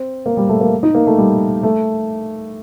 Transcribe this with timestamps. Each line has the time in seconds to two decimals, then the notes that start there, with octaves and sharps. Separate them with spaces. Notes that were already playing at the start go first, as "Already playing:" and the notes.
Already playing: C4
0.26 A#3
0.37 G3
0.49 A3
0.61 A#3
0.83 D#4
0.95 A#3
1.07 A3
1.18 G3
1.63 A3